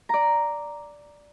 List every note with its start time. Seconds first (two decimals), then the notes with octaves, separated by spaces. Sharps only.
0.09 D5 A#5